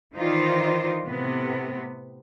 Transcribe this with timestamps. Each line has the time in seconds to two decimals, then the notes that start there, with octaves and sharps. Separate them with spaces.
0.15 D#3 E3 D#4 F4 C5 D5
1.04 A2 C3 B3